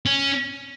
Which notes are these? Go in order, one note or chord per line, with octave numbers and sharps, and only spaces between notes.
C#4